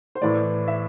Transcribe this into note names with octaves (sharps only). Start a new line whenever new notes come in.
C5
A2 E3 A3 D5
E5